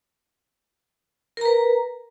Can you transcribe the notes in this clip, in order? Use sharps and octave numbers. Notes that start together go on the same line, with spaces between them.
A#4 B4 A#5